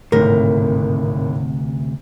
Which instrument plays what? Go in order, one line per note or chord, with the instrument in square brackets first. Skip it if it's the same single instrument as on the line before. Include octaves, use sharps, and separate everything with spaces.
[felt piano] G#1 A2 [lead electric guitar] D2 C3 [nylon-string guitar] A#4